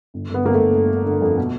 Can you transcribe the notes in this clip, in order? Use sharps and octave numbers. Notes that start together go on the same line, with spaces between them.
G1
G1 B3
G1 A#3
A3
G1
G1
D3
D3
F2
B2